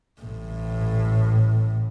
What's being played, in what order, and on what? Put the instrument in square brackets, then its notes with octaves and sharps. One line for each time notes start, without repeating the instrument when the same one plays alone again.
[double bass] A1 A2